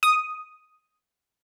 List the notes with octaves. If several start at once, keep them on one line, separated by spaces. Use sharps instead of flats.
D#6